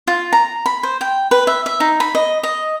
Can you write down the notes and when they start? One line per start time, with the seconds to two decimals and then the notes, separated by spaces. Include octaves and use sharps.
0.07 F4
0.33 A#5
0.66 B5
0.83 C5
1.01 G5
1.31 B4
1.47 E5
1.66 E5
1.80 D#4
2.00 B5
2.15 D#5
2.43 D#5